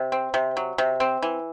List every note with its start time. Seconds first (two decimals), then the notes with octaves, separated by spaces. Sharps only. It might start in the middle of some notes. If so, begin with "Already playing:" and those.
Already playing: C3
0.12 C4
0.34 C3
0.57 F#3
0.78 C3
1.00 C4
1.22 E3